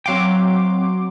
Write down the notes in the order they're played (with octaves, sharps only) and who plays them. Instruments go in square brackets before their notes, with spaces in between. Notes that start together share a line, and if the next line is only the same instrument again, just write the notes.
[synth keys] F#3 C6 D6 [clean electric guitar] C4 F5 G5